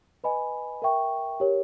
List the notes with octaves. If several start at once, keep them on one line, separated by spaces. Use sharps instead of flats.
B4 D#5 G#5 B5
A#4 E5 G5 C#6
G4 A#4 C#5